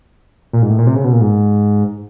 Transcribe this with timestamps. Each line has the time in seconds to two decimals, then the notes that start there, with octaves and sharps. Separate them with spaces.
0.53 A#2
0.62 G#2
0.70 A2
0.79 A#2
0.87 C3
0.95 C#3
1.04 B2
1.13 A#2
1.21 G#2